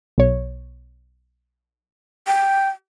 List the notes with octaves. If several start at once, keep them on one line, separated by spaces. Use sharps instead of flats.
B1 C#5
G5